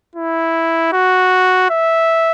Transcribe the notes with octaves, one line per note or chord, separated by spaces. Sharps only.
E4
F#4
E5